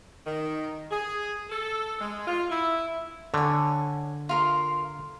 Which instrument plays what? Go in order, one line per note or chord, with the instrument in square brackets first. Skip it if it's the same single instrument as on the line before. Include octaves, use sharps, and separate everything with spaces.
[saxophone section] D#3
G#4
A4
G#3
F4
E4
[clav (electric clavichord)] D3 [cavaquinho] C#5 G#5
[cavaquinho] F4 A#4 C6